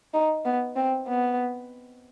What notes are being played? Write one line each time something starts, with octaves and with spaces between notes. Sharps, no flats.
D#4
B3
C4
B3